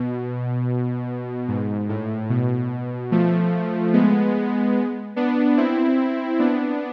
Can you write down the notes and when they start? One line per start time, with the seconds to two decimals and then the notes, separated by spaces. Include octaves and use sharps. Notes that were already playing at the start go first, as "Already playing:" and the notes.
Already playing: B2
1.48 G#2
1.89 A2
2.30 B2
3.12 F3 A3
3.93 G#3 B3
5.16 B3 D4
5.57 C4 E4
6.39 B3 D4